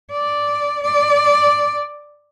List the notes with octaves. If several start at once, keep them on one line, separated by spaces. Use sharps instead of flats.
D5
D5